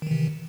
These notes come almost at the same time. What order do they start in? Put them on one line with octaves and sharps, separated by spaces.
D#3 E3 C3